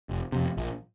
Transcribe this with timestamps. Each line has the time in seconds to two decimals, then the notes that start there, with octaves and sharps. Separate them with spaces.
0.09 F1
0.32 F2 C3
0.57 A#1